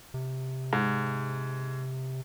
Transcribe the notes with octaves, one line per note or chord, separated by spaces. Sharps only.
C3
G#2